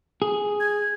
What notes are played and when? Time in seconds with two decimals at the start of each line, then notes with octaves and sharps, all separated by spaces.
0.22 G#4
0.60 G#6